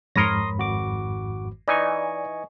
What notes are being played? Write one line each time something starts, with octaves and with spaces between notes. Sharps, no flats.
F2 G#2 A#4 C#5 B5 C6 D#6 A#6
G#1 F#4 D6
E3 D#4 D5 D#5 G#5 C#6